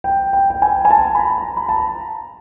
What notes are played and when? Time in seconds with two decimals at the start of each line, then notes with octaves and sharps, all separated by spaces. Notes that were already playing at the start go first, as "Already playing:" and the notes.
0.04 G5
0.33 G5
0.50 G5
0.62 G#5
0.85 G#5
0.91 A5
1.15 B5
1.19 A#5
1.38 A#5
1.57 B5
1.69 A5
1.76 A#5